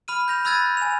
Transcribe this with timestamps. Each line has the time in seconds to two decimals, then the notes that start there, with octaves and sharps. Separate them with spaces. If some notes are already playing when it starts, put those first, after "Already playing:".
0.08 B5 F6 D#7
0.28 G6 A#6 F7
0.45 B5 E6 F#6 G#6 A6 D#7
0.77 G#5 F7